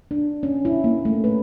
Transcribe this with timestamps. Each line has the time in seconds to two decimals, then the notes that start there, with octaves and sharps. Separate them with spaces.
0.11 D4
0.43 C#4
0.65 E4
0.84 A#3
1.05 A3
1.24 B4